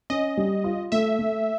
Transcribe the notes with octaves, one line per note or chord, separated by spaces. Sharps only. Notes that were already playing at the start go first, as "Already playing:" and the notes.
C#4 D#5
G3
F4
A3 E5
A3